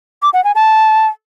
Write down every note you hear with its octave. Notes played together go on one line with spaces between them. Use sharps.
D6
F#5
G#5
A5